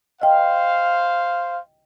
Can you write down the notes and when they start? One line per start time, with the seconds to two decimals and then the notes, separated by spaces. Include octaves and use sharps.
0.22 C5 D#5 F5 G5